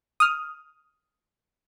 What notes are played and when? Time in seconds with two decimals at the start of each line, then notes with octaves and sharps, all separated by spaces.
0.20 D#6 F6